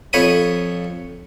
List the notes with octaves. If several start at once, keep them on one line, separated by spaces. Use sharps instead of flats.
F2 C#5 B5 D#6